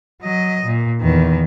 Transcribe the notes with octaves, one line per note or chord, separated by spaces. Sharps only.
F#3 D#5
A#2
E2 D#3